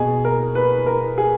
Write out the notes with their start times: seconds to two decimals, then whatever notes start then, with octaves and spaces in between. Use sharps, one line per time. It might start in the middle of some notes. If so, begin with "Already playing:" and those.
Already playing: B2 G#4
0.25 A#4
0.55 B4
0.86 A#4
1.18 G#4